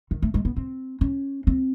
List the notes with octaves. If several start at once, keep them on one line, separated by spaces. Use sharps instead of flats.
D#3
A3
G#3
B3
C4
C#4
C4